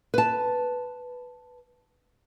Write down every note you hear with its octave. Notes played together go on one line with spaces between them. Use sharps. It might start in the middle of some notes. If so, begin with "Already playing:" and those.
B4 A5